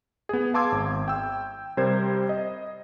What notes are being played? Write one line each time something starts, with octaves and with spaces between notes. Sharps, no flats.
B3 G#4
F5 A5 C6 D6 E6 G#6
G#1
G5 E6
C3 G3 A#4 C5 G#6
D#5